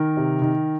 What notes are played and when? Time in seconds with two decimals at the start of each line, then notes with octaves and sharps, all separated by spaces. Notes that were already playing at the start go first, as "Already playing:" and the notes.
Already playing: D#3 A#4
0.17 C3
0.42 D#3